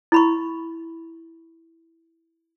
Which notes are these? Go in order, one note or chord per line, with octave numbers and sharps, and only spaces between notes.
E4 B5 C#6